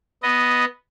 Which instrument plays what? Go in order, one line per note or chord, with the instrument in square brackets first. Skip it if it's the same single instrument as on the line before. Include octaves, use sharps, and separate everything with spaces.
[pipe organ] B3 D#5